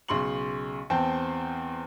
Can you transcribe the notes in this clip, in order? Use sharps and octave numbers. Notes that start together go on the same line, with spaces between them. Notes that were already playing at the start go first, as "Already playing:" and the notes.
B1 C#3 C6 C#6 F#7
E2 C4 C5 G5 A5